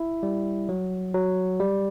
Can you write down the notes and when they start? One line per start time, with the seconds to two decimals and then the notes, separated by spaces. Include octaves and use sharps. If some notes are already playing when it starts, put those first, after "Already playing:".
Already playing: E4
0.23 G3
0.69 F#3
1.14 F#3
1.60 G3